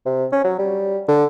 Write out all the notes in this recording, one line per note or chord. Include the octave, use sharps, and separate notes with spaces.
C3
C#4
F#3
G3
D3